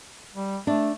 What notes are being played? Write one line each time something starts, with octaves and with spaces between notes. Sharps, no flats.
G3
A3 D4